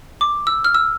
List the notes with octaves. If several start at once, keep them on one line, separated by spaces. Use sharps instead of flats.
D6
E6
F6
E6